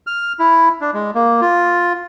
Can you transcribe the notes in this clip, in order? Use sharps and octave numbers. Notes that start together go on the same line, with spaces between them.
F6
E4
D4
G#3
A#3
F4